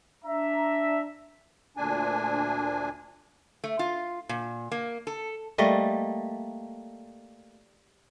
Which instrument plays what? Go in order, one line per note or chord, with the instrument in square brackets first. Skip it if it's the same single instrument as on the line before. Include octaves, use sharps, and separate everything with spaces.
[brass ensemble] D4 E5 A#5
[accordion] D2 A#2 D4 G#5
[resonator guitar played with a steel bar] A3
F4
A#2
A#3
A4
[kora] G3 A3 A#3 D#5